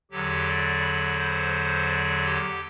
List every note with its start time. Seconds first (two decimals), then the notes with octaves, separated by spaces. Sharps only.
0.11 E2 D3 F#3 G4
0.46 D5
0.82 B5
1.17 C5
1.53 C5
1.88 D5
2.24 G4